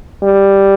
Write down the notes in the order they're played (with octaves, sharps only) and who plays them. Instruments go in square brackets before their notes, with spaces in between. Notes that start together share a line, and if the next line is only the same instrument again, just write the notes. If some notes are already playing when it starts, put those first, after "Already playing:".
[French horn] G3